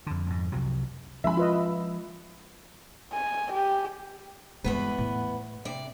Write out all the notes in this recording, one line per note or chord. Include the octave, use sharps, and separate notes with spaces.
F2 D3
F2 G#2
C2 C3 F3 F#3
F3 G#3 C#4 E5 B5
F4 B4 D#5
G#5
G4
E2 G2 G#3 B3 B4
A2
C3 D5